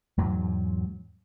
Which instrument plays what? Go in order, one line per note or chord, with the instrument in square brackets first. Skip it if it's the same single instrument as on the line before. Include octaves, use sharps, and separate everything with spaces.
[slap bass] E2 G#2 F#3